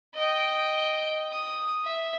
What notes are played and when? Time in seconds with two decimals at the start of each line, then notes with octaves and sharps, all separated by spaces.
0.15 D#5 G5
1.31 D#6
1.84 E5